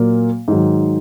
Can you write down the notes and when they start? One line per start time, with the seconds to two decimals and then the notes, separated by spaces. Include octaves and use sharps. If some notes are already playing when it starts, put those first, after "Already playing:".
Already playing: A#2 F#3 A#3
0.48 G#2 D#3 F#3